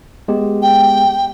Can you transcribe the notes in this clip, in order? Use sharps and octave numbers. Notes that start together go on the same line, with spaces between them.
G#3 B3 G4
G5